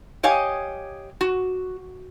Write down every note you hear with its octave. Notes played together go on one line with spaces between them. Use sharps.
G4 C#5 D#5 F5 G#5
F#4